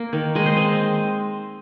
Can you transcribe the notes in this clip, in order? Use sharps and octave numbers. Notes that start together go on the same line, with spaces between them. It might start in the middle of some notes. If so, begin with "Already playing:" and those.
Already playing: A#3
D#3
G#3 D#5
C5
C4 D#5